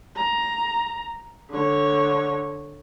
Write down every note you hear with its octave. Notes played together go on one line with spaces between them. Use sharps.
A#5
D3 C#5